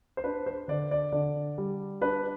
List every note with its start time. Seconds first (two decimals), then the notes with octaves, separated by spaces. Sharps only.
0.17 C5
0.24 D4 B4
0.46 C5
0.68 D3 D5
0.91 D5
1.12 D3 D5
1.58 G3
2.01 D4 B4